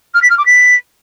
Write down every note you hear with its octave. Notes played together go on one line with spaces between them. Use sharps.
F6
B6
F6
D6
B6